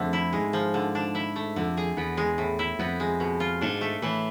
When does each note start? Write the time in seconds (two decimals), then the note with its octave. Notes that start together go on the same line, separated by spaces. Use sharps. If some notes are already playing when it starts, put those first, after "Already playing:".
Already playing: F2 D3 A3 C4
0.13 E4
0.33 G#2 G#3
0.53 F3
0.74 D3
0.95 D4
1.15 E4
1.36 A3
1.56 F2 D3
1.77 G#4
1.97 E2 B3
2.17 G#3
2.38 A2
2.59 E4
2.79 F2 B3
3.00 G#3
3.20 B2
3.40 F4
3.61 G#2 D4
3.81 A3
4.02 A2 E3